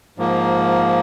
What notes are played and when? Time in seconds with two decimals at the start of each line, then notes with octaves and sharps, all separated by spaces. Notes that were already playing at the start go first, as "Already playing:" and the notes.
0.18 G#2 F3 A#3